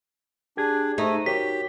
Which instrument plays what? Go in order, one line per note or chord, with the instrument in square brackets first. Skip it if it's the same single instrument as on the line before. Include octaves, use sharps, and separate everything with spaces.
[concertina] D4 [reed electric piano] G4 G#4 G#6
[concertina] A3 [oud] D#4
[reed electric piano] F#4 A#4 C#5 [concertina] G4 [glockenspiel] B6